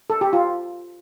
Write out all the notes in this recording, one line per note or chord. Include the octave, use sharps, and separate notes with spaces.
A4
G4
F4